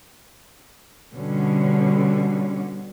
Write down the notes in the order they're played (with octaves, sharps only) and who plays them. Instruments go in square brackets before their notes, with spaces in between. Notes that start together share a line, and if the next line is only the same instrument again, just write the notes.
[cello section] B2 D3 G3 C#4